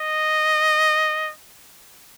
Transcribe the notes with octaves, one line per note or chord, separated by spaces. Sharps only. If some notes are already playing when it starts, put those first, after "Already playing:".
Already playing: D#5